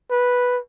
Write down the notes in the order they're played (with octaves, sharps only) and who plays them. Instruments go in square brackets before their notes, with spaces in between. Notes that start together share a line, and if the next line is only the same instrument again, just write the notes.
[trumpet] B4